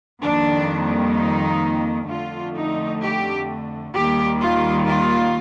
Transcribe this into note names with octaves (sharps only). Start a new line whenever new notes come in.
F2 D#3 G3 A#3 D4
D#4
F2 D3 A3 F4
D#4
G4
D#2 D#3 G3 A#3 G4
F4
F4